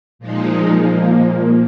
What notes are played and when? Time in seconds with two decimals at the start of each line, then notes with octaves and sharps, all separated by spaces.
0.19 A#2 F3 G#3 D#4
0.79 A#2 F3 A#3